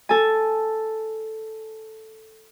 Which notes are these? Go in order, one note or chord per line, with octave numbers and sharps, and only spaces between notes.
A4 G#5